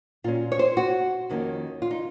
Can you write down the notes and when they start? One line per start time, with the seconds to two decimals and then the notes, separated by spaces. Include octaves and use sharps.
0.24 A#2 F#3 C#4 F4
0.52 C#5
0.59 C5
0.77 F#4
1.29 F2 D#3 A#3 C#4
1.82 F4
1.91 D#4